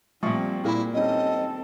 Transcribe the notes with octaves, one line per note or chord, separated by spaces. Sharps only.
A#2 F3 G3 C4 E5 C#6 D#6
A#2 A#3 E4 G#4 B5
G3 C4 C#4 D#4 A4 D#5